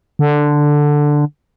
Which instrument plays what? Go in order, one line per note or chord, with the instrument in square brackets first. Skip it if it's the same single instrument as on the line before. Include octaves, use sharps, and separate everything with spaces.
[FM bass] D3